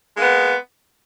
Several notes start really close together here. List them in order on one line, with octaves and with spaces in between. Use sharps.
G#3 A#3 B3